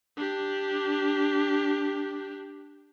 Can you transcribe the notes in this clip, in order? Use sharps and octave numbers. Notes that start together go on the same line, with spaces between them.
D4 G4